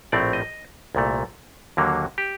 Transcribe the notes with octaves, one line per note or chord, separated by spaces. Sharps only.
A#1 A2 A3 C4 D5
D#5
C2 A#2 A3
D#2 D3 F#3 A#3
G4